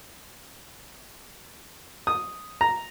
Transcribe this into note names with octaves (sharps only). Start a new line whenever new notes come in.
D#6
A#5